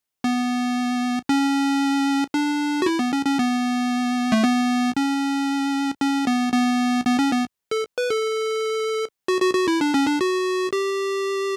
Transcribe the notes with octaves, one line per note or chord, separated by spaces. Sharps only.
B3
C#4
D4
F#4
E4
B3
C#4
C#4
B3
A3
B3
C#4
C#4
B3
B3
B3
C#4
B3
A4
B4
A4
F#4
F#4
F#4
E4
D4
C#4
D4
F#4
G4